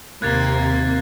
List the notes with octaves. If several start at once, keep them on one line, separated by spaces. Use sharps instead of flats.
D#2 C3 A#3 F#6 G#6 A6